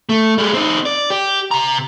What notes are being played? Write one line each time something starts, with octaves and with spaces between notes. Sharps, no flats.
A3
G3 G#3
C4 D#4
D5
G4
C3 A#5